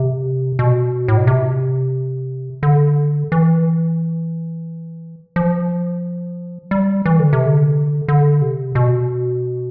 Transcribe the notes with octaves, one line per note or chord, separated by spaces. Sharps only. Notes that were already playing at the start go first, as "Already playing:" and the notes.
Already playing: C3
B2
A2
B2
C3
D3
E3
F3
G3
E3
D3
C3
D3
D3
C3
B2